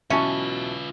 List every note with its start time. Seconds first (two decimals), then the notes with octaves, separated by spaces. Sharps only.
0.10 B2 E3 F#3 C#4 F4 B4 E5 A5